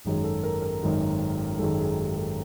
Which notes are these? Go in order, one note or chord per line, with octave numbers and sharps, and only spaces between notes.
G#1 F#2 D#3 G#3 G#4
A4
A#4
A#4
G#1 F#2 D#3 G#3
G#1 F#2 D#3 G#3 A4
G#4
G4
A4